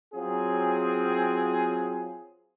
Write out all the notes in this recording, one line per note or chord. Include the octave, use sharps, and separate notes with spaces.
F#3 C4 F4 G#4